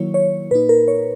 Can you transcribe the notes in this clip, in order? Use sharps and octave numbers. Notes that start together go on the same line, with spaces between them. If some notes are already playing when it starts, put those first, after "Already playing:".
Already playing: D#3 F#3 A#3 E4 C#5
C#5
A#2 A#3 D#4 B4
A#4
C#5